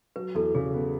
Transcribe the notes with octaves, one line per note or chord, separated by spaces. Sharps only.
F#3 B4
E2 A4
C#3 G#4
B3